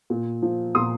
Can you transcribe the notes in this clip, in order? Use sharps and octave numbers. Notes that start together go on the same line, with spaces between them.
A#2
F3
A#2 C6 D#6